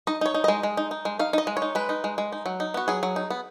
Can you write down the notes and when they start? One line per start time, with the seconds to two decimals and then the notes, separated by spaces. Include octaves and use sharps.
0.07 D#4 D#5
0.21 D#4
0.26 C#5
0.34 D#4
0.44 G#3 D#5
0.63 G#3
0.77 D#4
0.91 D#4
1.05 G#3
1.19 D#4 F5
1.33 D#4 D#5
1.47 G#3
1.57 C#5
1.62 D#4
1.75 G#3 B4
1.89 D#4
2.04 G#3
2.18 G#3
2.32 D#4
2.46 F#3
2.60 D#4
2.74 B3 F#4
2.88 F#3 G#4
3.03 F#3
3.16 D#4
3.30 B3